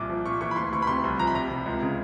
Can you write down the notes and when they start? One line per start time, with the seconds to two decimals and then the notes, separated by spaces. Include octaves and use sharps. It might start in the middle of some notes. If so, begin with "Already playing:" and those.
Already playing: C2 A#2 D6
0.09 F3
0.26 A#2 C#6
0.41 E3 C#6
0.51 B5
0.56 D2 C6
0.72 D2 C#6
0.82 B5
0.87 C3 C6
1.04 C2
1.19 F3 A#5
1.27 B5
1.35 C3 A#5
1.50 C3
1.66 C#2
1.82 C#3